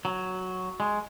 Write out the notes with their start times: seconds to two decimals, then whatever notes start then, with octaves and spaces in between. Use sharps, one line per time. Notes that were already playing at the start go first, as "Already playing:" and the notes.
0.05 F#3
0.80 G#3